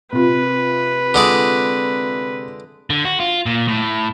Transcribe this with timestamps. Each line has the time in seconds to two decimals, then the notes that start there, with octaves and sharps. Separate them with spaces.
0.13 C3 F4 B4
1.14 D3 G#3 D5
2.90 D3
3.05 F#4
3.20 F4
3.46 A#2
3.68 A2